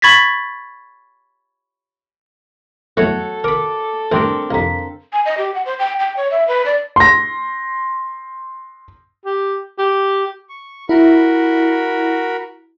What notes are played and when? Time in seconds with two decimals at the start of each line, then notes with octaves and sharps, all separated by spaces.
0.02 B5 C#6 G#6 A6 B6
2.97 E2 F#3 A3 F#4 A4 C#5
3.44 A#4 B5 D6 D7
4.12 A1 G2 C4 D4 A#4 G5 C6
4.51 C2 F2 F5 A#5 B6
5.13 G#5
5.25 D#5
5.38 G4
5.54 F#5
5.66 C5
5.79 G5
6.00 G5
6.17 C#5
6.31 E5
6.48 B4
6.66 D5
6.96 C6 A#6
9.26 G4
9.79 G4
10.49 C#6
10.89 E4 F#4 A#4 B5